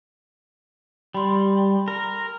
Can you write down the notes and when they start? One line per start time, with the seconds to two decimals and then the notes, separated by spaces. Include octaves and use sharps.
1.14 G3 B5 C6
1.88 A#4